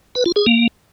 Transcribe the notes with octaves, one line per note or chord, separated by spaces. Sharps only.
B4
F4
G#4
A#3